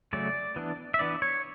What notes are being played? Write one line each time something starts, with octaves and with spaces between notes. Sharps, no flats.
C#3 F#3 A3 C#4 D5
E3 B3 D4
E5
E3 B3 D4 D5
C#5